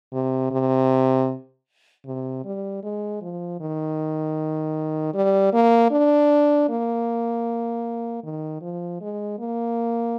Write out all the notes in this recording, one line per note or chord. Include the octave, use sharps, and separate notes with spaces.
C3
C3
C3
G3
G#3
F3
D#3
G3
A#3
D4
A#3
D#3
F3
G#3
A#3